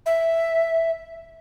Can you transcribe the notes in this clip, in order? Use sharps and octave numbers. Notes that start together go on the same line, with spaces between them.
E5